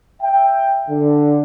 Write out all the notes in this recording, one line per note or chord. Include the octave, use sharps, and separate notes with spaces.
E5 G5
D3